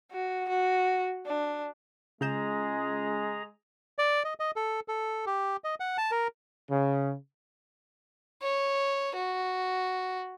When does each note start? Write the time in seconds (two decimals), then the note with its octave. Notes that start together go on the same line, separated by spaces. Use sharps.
0.12 F#4
0.48 F#4
1.26 D4
2.21 C#2 C#3 G#3 G#4 A#5 G6 E7
3.99 D5
4.24 D#5
4.40 D#5
4.56 A4
4.88 A4
5.26 G4
5.64 D#5
5.80 F#5
5.98 A5
6.11 A#4
6.70 C#3
8.42 C#5
9.15 F#4